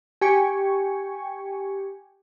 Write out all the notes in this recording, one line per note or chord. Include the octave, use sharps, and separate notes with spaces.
G4 G#5 C#6